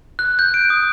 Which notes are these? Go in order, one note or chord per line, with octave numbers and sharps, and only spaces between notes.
F#6
G6
D7
D#6